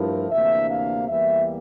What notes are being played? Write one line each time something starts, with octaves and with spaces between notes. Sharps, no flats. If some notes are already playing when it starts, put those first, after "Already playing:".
Already playing: G2 F3 A3 E4 A#4
D2 C3 E3 A#3 D4 E5
F5
E2 E3 G3 A#3 E5